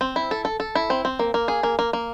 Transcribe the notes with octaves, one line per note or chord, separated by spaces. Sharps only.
C4
E4
A4
A4
A4
E4
C4
C4
A#3
A#3
G#4
A#3
A#3
A#3